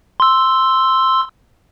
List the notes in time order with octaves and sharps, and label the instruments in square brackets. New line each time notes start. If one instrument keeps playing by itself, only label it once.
[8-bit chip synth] C6 E6